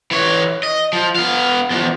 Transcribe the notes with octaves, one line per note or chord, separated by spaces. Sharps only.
E3 C#5
D#5
F3
B3 F5
E2 F3